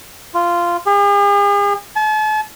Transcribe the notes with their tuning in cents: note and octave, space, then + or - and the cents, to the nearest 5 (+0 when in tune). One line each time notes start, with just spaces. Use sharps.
F4 -10
G#4 -45
A5 -40